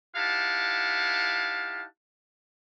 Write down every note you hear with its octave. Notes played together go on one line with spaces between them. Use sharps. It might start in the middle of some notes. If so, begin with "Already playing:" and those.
D#4 E4 G4 F5 F#5 A5